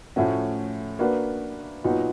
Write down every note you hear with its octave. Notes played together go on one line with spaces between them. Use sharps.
A2 F3 A3 C#4 F#4
A#3 D4 F#4 B4
A#2 F#3 B3 D#4 F#4